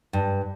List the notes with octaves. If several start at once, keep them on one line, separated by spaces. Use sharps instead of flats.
G2